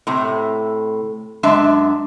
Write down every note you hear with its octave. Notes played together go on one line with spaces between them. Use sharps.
A2 C3
F#2 G#3 D4 E5